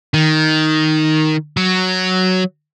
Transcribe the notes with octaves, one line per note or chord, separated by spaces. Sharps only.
D#3
F#3